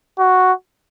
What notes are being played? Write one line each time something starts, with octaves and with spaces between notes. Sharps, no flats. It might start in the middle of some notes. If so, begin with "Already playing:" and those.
F#4